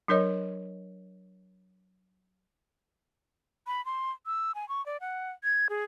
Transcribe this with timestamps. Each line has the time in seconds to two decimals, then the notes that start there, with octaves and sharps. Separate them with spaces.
0.08 F#3 D4 A#4 C#5 D#5
3.67 B5
3.86 C6
4.26 E6
4.55 G#5
4.69 C#6
4.86 D5
5.01 F#5
5.44 G#6
5.70 G#4